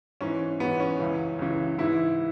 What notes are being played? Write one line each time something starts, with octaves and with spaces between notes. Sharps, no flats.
G#2 E3 C#4
G#2 E3 B3
C#4
C#2 C#3 E3
C#2 C#3 E3
G#2 E3 E4